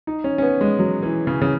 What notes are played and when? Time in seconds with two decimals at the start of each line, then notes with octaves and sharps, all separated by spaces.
0.07 D#4
0.24 C#4
0.38 C#4
0.42 B3
0.61 G#3
0.79 F#3
1.03 E3
1.27 C#3
1.41 C#3